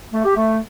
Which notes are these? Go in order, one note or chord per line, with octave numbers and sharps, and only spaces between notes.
A3
G4
A3